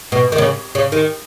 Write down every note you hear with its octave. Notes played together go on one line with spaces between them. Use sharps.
B2
D#3
C#3
C#3
D#3